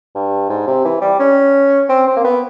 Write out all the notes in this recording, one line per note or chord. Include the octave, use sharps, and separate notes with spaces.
G2
G#2
C3
E3
G3
C#4
C4
C4
A#3
B3